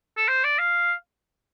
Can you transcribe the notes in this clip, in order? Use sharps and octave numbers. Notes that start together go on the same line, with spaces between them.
A4
C5
D5
F5